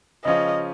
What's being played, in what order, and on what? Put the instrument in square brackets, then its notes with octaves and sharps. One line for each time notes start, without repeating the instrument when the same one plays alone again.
[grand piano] C#3 F3 C#4 F4 [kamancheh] D#5